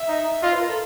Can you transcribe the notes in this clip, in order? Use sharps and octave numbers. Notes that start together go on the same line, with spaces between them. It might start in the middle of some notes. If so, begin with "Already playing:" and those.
Already playing: E5
D#4
F4 D#5
B4
A#4
A4